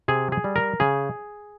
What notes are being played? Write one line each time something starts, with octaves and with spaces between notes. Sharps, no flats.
C3 G#4
G#4
G3
A#4
C#3 G#4